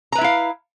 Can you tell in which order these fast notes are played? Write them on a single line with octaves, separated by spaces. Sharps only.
A#5 B4 E5 E4 F5